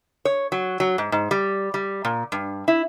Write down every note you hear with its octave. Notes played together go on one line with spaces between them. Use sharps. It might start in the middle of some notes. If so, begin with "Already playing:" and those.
C#5
F#3
F#3
G#2
G#2
G3
G3
A#2
G2
E4